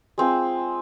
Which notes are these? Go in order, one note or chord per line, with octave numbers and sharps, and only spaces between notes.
G#3 C4 F4